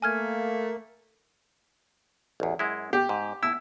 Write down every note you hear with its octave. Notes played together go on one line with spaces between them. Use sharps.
A3 A#3 G#5 F6 G#6
A1 E2
F#2 G#3 E4
G4
G#2
E4 E6